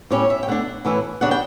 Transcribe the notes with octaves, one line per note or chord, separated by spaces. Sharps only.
A2 G3 C#4 C#5
E5
G5
D3 A3 D4 F#5
A2 E3 A3 C#4 E4
C#3 G3 D4 F#5
G5